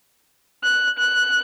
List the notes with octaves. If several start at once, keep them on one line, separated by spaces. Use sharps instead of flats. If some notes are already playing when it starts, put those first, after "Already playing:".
F#6
F#6